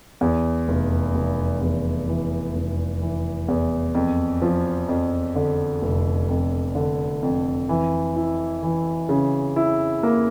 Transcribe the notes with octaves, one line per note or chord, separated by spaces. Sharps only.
E2
F1
F1
E2
E3
F1
E3
E2
F2
F3
F2
D3
F1
F2
D3
F2
E3
E4
E3
C#3
E4
A#3